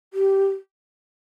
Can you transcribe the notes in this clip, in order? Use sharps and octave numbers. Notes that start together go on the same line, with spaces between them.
G4